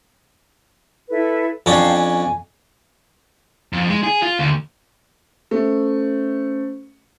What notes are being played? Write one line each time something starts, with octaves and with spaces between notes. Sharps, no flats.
E4 A4 B4
F2 C#4 D4 F5 G5 A5
G#5
F2
G#3
G#4
F4
D2
A3 C#4 C5